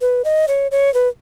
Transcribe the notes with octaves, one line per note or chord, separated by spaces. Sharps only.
B4
D#5
C#5
C#5
B4